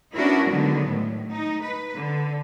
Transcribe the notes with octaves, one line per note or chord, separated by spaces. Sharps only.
B3 C#4 D4 E4 F#4 A#4
D3 D#3 F#3 G#3 B3
A2
D#4
B4
D3